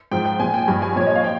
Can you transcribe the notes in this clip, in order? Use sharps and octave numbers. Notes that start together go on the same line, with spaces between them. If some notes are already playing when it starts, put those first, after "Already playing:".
G#2 F3 G5
G5
A#2 F3 G#5
G5
G2 F3 G#5
G#5
A#2 F3 C#5
D#5
F5
G5